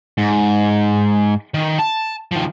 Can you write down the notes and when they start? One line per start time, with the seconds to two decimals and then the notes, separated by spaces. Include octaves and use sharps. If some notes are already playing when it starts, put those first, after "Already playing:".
0.18 G#2
1.54 D#3
1.79 A5
2.32 D#3 F3